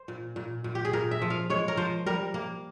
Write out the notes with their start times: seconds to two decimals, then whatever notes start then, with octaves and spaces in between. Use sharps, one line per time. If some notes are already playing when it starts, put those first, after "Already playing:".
Already playing: C5
0.08 A#2
0.36 A#2
0.64 A#2
0.75 G4
0.85 G#4
0.93 A#2 A#4
1.11 E5
1.22 F3
1.30 F5
1.50 G#3 C#5
1.68 A#4
1.77 F3 C5
2.06 G3 A#4
2.34 A#3